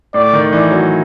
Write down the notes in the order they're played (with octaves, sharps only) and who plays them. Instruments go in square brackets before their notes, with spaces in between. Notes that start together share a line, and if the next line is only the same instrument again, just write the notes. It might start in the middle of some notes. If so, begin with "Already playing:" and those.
[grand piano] A2 [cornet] D5
[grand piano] D#3
[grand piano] E3 [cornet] D5
[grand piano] F#3